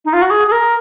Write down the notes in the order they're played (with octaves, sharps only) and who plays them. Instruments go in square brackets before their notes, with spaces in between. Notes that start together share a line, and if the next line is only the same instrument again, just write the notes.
[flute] D#4
F4
F#4
G#4
G#4
A#4